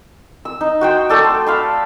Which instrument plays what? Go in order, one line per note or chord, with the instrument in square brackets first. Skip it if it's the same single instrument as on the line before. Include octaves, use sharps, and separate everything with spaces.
[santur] E6
D#4
F#4 C5 G5
A3 A4 D5
C6
F5 B5 C6